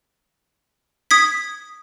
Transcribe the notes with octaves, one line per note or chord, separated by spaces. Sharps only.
D#6 G#6 B6